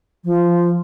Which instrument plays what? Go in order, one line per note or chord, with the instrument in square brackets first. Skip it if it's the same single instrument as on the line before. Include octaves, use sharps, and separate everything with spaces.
[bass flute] F3